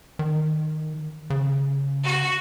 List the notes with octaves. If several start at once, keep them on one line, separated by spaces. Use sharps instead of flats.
D#3
C#3
F#4